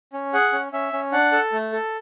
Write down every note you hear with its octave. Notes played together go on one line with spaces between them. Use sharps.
C#4
G#4 F#5
C#4
C#4 E5
C#4
D4 F#5
A4
A3
A4